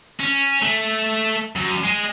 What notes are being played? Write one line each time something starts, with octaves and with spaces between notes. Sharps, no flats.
C#4
A3
F#2
G#3